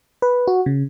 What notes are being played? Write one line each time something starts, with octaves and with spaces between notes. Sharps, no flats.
B4
F#4
C#3